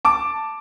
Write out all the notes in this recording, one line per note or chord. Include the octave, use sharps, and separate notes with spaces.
A5 D6